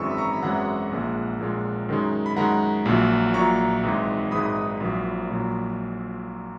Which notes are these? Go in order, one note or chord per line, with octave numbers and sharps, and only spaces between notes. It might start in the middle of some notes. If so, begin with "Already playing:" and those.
Already playing: G#1 F#2 E3 G#3 C#6 E6
B5
A#5 C#6
B5
G#1 F#2 E3 G#3 F#5 A#5
A#1 A#2 G#3
A#1 A#2 G#3
F#2 D#3 G#3
B5
F#2 D#3 G#3 F#5 A#5
A#1 A#2 F#3
A#1 A#2 F#3 A#5 C#6
G#1 G#2 E3 G#3
G#1 G#2 E3 G#3 B5 D#6
A#1 A#2 F#3
A#1 A#2 F#3